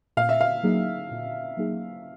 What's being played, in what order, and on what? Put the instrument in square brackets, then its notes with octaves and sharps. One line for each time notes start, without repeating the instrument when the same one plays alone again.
[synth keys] A#2 [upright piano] F5
[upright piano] E5
F5
[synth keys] F#3 A#3 D#4 G#4
A#2
F#3 A#3 D#4 G#4